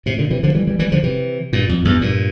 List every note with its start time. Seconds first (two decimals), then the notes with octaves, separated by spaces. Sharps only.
0.06 A2 C3
0.18 A#2 D3
0.30 C3 E3
0.43 D3 F3
0.55 E3 G3
0.67 E3 G3
0.79 E3 G3
0.92 D3 F3
1.03 C3 E3
1.53 G2 A#2
1.69 F2
1.85 E2 G2
2.01 G2 A#2